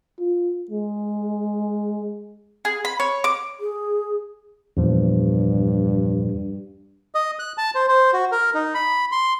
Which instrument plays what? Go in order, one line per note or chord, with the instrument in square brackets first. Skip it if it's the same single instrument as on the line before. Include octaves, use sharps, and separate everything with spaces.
[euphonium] F4
G#3
[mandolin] G#4
B5
C#5
D6
[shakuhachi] G#4
[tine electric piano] E2 A#2 F3 [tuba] G2
[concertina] D#5
F#6
A5
C5
C5
F#4
A#4
D#4
B5
C6